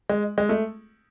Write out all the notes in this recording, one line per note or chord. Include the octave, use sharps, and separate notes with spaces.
G#3
G#3
A3